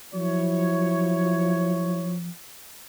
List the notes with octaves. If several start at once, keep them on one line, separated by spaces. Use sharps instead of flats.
F3 F#3 E4 C#5